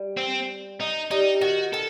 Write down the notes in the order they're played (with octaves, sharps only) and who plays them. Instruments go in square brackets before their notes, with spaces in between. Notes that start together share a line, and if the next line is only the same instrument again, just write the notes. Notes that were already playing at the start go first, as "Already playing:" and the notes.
Already playing: [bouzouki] G3
[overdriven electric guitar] C4
D#4
[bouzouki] G3 [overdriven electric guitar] D#4
[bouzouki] D#3 [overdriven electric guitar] F#4
[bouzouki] D#3 [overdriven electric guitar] A4